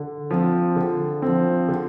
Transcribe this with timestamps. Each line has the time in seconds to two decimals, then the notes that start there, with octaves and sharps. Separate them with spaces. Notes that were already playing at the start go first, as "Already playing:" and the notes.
Already playing: D3
0.31 F3 C4
0.76 D3
1.22 F3 C4
1.68 D3